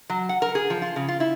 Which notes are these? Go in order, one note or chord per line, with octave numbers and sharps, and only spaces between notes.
F#3
F#5
A#4
G#4
F3
F4
C#3
F4
E4